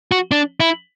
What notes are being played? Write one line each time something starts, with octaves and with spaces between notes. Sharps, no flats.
F#4
D4
E4